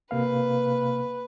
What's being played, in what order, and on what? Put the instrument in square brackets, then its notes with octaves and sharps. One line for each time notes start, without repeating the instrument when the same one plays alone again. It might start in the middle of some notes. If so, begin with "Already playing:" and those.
[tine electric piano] C3 A#3 F5 [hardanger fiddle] B4